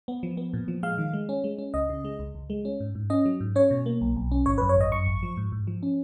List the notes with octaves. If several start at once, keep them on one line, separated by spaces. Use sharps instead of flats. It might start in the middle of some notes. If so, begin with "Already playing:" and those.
B3
F3
B3
A#2
F3
G#3 F5
D#3
G#3
C#4
G#3
C#4
C#2 D#5
C#3
G#3
C#2
C#2
G#3
C#4
G#2
G#2
C#4 D#5
F#3
G#2
C#4 C#5
B2
A#3
B1
B1
C#4
G#1 C#5
B4
F#2
C#5
G#1 D#5
F#2 C#6
G#1
F3
G#2
G#2
F3
C#4